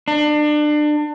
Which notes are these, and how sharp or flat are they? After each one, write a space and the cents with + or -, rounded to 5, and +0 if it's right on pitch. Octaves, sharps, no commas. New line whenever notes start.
D4 +30